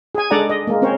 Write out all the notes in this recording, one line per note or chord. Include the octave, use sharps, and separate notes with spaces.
G#4 G#5
G#3 D4 A4 D5 F#5 A#5
D#5
G#3 A#3
C4 C#4 A#4 C5 C#5